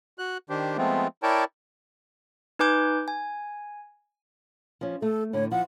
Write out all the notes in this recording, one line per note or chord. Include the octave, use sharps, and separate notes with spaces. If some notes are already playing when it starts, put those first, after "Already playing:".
F#4 F#6
D#3 D4 G4 C5
F3 G#3 A3 B3 C4 F4
E4 A#4 C#5 D5 G5 A5
D#4 B4 G#5 D6 G6
G#5
F3 C#4
A3 A4
A2 D3 C#5
F3 F#5